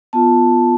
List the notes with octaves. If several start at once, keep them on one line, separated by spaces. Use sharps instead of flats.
B3 F4 A5